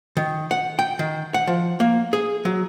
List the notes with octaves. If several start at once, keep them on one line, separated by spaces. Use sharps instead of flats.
D#3
F#5
G5
D#3
F#5
F3
A#3
G#4
F#3